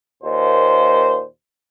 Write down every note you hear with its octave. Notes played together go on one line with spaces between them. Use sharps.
D#2 A#2 C5